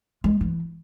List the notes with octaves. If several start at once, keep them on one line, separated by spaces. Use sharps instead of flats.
G#3
E3